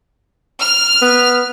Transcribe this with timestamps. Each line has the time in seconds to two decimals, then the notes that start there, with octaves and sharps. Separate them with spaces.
0.61 F6
1.02 B3